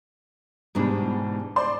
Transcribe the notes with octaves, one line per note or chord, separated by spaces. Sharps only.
E2 G#2 B2 G3 G#3 D4
C5 D5 C6